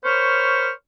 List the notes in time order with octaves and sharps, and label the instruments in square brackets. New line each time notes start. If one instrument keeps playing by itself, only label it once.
[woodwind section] A#4 C5 C#5 B5 C#6 F6